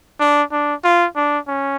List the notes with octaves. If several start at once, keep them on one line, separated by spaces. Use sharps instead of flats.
D4
D4
F4
D4
C#4